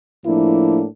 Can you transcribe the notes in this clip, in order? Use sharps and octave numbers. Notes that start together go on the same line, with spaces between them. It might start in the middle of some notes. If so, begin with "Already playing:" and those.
A2 F3 A#3 D4 E4